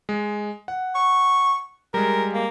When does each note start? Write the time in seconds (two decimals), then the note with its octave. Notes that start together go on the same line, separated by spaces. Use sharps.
0.09 G#3
0.68 F#5
0.95 C#6
1.94 G3 G#3 A#4
2.33 A#3